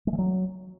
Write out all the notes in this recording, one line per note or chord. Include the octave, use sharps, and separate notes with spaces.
G#3
E3
F#3